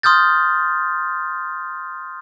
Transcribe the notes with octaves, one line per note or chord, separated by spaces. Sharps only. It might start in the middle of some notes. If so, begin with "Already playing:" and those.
C6 D#6 F6 G6 A6